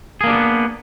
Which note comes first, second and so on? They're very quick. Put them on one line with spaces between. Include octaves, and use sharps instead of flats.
G#4 A#3 D4 G4 B3